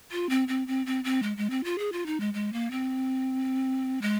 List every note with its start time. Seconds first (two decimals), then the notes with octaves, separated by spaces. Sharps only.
0.12 F4
0.29 C4
0.48 C4
0.67 C4
0.86 C4
1.04 C4
1.23 G#3
1.37 G#3
1.50 C4
1.64 F4
1.78 G#4
1.92 F4
2.06 D#4
2.20 G#3
2.34 G#3
2.53 A#3
2.71 C4
4.02 G#3